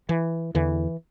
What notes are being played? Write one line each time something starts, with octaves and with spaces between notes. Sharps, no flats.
E3
E2 D3 E3